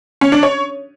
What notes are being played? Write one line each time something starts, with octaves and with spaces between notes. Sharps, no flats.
C#4
D4
C#5